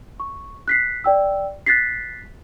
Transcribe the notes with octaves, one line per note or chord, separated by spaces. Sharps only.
C#6
F#6 B6 C7
D5 G5 E6
F#6 A6 B6 C7